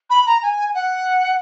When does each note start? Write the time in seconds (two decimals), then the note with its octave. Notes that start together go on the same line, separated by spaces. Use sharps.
0.10 B5
0.26 A#5
0.42 G#5
0.74 F#5